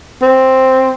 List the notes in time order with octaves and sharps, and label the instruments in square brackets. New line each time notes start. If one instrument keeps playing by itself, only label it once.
[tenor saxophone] C4